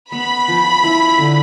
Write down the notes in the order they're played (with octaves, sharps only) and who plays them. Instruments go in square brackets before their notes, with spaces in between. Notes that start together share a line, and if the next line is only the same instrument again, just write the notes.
[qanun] B3 [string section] B5
[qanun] F3
E4
D3